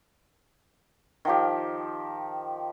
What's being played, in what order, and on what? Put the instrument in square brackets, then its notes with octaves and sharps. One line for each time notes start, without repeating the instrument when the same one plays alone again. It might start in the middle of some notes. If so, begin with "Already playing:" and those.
[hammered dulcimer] D#3 F3 G4